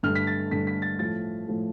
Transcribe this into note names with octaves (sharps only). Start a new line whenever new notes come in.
G2 D3 A3 F6
B6
A6
G2 D3 A3 B6
B6
A6
A2 F3 A3 A6
A2 F3 A3